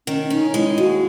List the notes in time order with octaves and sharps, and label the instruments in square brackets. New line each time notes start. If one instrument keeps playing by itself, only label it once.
[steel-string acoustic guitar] D#3 [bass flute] C#4
[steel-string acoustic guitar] C#4 [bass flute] D#4
[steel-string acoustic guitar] G#3 [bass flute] E4
[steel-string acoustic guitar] D#2 [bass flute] F#4